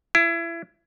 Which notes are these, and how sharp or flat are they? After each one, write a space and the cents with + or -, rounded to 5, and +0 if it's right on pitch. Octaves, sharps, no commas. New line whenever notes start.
E4 +30